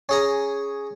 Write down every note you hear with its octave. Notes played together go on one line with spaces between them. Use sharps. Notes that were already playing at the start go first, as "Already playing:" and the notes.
C#4 G#4 A#5